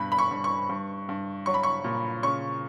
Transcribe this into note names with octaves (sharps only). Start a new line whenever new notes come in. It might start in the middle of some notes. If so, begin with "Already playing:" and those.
Already playing: G2 B2 B5
B5
C#6
G2
C#6
G2
G2
F#3 C#6
B5
C#6
A#2
C#3 C#6